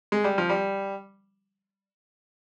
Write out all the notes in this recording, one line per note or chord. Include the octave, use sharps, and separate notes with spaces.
G#3
G3
F3
G3